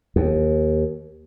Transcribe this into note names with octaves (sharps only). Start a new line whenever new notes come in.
D#2